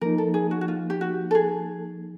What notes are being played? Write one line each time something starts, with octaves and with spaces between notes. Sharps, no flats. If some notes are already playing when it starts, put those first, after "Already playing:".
F3 A#3 D#4 A#4
A4
G#4
F#4
F#4
F4
G4
F#4
A4
G#4